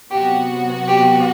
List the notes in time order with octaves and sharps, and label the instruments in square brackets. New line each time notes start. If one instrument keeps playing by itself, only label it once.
[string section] C3 F#3 B3 F#4 [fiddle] G4
[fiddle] G4